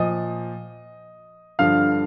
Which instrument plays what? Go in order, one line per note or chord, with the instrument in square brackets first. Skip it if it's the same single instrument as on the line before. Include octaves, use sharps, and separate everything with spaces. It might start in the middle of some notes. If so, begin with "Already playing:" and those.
Already playing: [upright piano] A#2 F3 D#5 D#6
G2 D3 F3 F5 F6